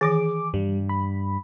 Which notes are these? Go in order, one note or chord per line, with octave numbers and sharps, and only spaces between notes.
D#3 E3 G#4 D6
G2 G3
B5